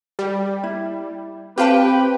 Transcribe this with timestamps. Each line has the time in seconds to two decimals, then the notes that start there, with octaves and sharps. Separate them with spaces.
0.19 G3
0.64 E4
1.58 C4 F4 G4 B4 F5 G5 A5